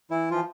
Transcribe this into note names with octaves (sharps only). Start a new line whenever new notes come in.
E3 E4
E3 F3 F4